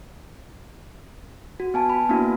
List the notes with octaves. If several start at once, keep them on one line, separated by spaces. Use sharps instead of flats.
F#4
B3 G#5 A5
B5
A#3 B3 D4 E4 F#4